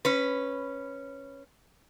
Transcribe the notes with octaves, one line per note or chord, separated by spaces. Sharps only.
C#4 B4